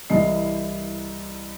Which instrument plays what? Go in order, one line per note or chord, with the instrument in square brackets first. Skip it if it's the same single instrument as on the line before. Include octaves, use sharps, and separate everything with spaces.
[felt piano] C2 E3 D#5 C7